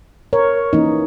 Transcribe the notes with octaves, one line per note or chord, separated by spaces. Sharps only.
A#4 C#5
E3 A#3 C#4 D#4